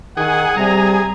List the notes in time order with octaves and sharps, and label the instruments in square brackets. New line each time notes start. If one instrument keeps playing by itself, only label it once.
[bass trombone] D#3 [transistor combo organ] G#4 [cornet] F#5
[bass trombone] C3 [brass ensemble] G3 [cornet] A#5